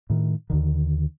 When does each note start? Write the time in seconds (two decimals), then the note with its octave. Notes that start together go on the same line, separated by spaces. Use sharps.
0.10 A2 D#3
0.50 D#2 D3 D#3